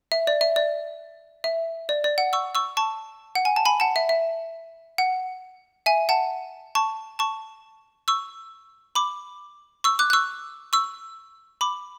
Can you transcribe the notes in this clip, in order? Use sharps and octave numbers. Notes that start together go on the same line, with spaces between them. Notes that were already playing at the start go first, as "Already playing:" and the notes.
E5
D5
E5
D5
E5
D5
D5
F#5
C#6 E6
C#6 E6
A5 C#6
F#5
G#5
A5
G#5 B5
F#5 A5
E5
E5
F#5
E5 G#5
F#5 A5
A5 C#6
A5 C#6
C#6 E6
B5 D6
C#6 E6
D6 F#6
F#6
C#6 E6
C#6 E6
B5 D6